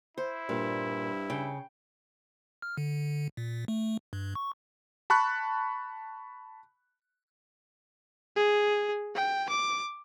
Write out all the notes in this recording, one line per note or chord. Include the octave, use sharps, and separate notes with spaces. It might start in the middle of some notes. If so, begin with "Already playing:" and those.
E4 C5
G2 A#2
C#3 G5
F6
D3
A#2
A3
G2
C#6
A5 B5 C#6 F#6
G#4
G5
D6